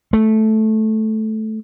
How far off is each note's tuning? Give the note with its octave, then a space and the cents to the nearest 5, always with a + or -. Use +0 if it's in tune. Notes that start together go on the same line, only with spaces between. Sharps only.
A3 -10